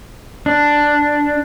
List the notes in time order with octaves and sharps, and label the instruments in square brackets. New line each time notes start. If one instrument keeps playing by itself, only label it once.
[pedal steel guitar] D4